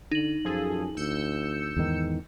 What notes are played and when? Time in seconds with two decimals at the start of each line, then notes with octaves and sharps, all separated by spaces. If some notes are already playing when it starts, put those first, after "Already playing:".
0.12 D3 D#4 F#7
0.45 F#2 F3 G#4 A4
0.97 D2 E6 G6 C#7
1.77 E2 G#2 D#3